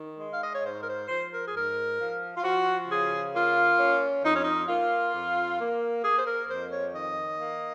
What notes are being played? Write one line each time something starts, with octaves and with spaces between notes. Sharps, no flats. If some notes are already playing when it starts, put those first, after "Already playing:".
Already playing: D#3
G#3
F5
D#5
C#5
G#2 C5
A#4
C5
F3 C5
A#4
G#4
G#2 A#4
F3
F4
F3 F#4
C#3 G#4
A#3 F4
C#4
F2 D#4
C#4
D#4
A#3 F4
F2
A#3
A#3 G#4
C5
A#4
F2 C5
C#5
D#3 D#5
A#3